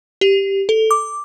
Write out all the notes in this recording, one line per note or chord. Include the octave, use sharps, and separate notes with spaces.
G4
A4
D6